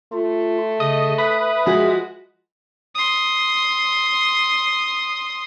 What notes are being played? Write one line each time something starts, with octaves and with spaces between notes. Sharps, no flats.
A3 F4
C#3 D#5
B4 E5 D#6
F3 G#3 F#4 B4
C6 D#6